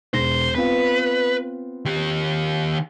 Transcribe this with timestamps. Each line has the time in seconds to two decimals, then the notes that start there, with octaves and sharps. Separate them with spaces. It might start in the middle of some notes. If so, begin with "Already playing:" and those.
0.14 E1 C5 A#6
0.55 B3 C4 F4 B4
1.85 D#3 G4